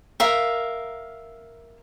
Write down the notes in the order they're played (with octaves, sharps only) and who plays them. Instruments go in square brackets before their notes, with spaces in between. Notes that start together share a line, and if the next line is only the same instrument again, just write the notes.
[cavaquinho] A#4 E5 F5